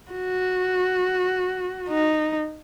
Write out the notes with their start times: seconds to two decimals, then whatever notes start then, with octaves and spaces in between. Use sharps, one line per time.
0.12 F#4
1.89 D#4